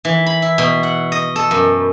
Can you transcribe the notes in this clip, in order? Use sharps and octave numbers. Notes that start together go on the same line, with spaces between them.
E3
B5
E4
B2
F#5
D#5
A4
F#2